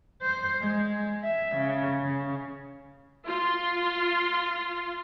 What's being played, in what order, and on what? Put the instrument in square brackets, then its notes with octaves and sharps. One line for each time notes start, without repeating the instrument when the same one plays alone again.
[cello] C5
G#3
E5
C#3
C#3
[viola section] F4 C6